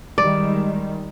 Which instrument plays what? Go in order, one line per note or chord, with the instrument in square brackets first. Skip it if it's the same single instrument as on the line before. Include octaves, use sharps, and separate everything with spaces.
[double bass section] D#3 G3 G#3 [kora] D5